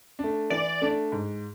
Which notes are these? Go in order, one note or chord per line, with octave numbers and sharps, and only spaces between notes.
A3 D4
E3 D5
A3 D4
G#2